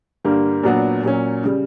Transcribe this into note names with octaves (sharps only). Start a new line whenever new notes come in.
G2 D3 G3 A#3
A#2 F#3 B3 D4 F#4
A#2 F#3 C#4
C#3 G3